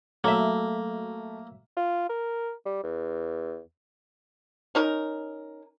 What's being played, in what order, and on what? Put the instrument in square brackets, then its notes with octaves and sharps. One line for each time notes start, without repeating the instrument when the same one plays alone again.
[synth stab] F#3 E5 [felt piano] A3 [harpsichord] A#3
[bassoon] F4
A#4
G3
E2
[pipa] C#4 D#4 A#4